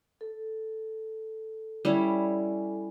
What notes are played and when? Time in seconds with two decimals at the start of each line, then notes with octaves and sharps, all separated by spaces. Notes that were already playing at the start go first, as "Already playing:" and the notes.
0.21 A4
1.85 G3 C#4 E4